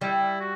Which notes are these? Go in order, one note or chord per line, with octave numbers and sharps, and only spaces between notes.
G3 E4
F#4